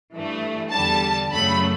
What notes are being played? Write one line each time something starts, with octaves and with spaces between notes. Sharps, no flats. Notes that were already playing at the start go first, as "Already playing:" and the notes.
G2 E3 A3
E2 D3 G3 A5
F#2 C#3 F#3 A3 B5